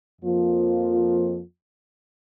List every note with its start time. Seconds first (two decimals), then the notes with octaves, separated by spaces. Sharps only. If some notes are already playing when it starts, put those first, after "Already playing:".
0.21 F2 F3 A#3 F4